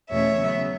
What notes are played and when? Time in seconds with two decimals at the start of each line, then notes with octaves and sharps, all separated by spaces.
0.11 E2 B2 A3 C#4 C#5 E5
0.39 C#3 F#3 B3